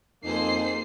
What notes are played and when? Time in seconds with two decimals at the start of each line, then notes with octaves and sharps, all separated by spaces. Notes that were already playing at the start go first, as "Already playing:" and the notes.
0.24 F2 A#3 D#4 G#4 A4 C5 C7